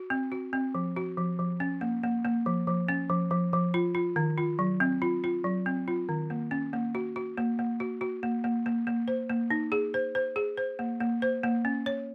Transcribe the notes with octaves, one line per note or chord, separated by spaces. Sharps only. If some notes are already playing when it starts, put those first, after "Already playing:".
Already playing: F#4
C4
F#4
C4
F3
F#4
F3
F3
C#4
A#3
A#3
A#3
F3
F3
C#4
F3
F3
F3
F4
F4
D#3
F4
F#3
C4
F4
F4
F#3
C4
F4
D#3
A#3
C#4
A#3
F#4
F#4
A#3
A#3
F#4
F#4
A#3
A#3
A#3
A#3
C5
A#3
D#4
G#4
C5
C5
G#4
C5
A#3
A#3
C5
A#3
C#4
C#5